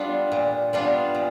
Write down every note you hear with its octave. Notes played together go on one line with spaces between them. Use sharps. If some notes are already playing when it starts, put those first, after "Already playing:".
Already playing: G3 B3 D4 F4
A#2
G3 B3 D4 F4
A#2